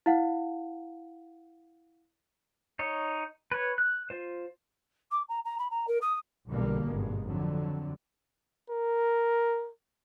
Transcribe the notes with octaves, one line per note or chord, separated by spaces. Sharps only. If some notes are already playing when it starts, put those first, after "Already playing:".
E4 F5 F#5
D#4 C#5
B4 C#5
F#6
F4 C5
D6
A#5
A#5
B5
A#5
A#4
D#6
B1 E2 B2 D3 G3 A#3
G#1 G2 B2 G#3
F2 D3 F#3
A#4